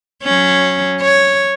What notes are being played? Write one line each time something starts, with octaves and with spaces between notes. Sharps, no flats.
F#3 C#4
C#5